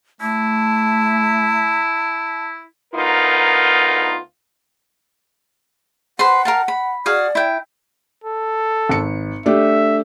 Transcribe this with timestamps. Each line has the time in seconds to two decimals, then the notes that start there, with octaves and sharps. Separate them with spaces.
0.21 A3 E4 A5
2.94 D2 B3 D#4 F4 A#4
6.19 B4 C5 F#5 C6
6.45 A#4 F5 A5
6.68 B5
7.06 F#4 G#4 D5 F5
7.35 E4 G5
8.24 A4
8.89 G#1 C#7
9.46 A3 D4 G4 E5